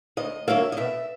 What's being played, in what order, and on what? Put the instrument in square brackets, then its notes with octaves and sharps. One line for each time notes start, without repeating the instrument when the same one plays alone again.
[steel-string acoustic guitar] D2 D#5
D3 F#3 A#3 E5
D#5
B2 E5